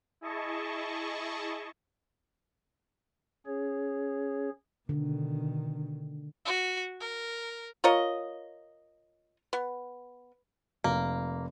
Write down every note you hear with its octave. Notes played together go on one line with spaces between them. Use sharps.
E4 G#4 D#5 A5 C#6
C#4 G#4 C#5
B2 D3 D#3
F#4
A#4
F4 A#4 C#5 D#5
B3
F1 A#3